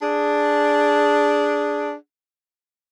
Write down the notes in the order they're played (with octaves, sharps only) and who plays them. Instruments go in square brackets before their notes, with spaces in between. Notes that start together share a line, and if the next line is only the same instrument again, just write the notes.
[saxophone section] D4 G#4